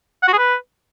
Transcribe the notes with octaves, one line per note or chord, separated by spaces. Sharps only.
F#5
F#4
G#4
B4